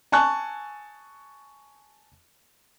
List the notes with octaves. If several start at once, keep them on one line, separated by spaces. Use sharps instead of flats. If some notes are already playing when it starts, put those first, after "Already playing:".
G#5 A5 C#6 F#6